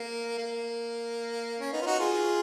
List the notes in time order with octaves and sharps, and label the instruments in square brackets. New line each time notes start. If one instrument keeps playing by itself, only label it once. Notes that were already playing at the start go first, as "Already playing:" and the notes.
Already playing: [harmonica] A#3
A#3
C#4
B3 D#4
F4
D#4 F#4
F4 G#4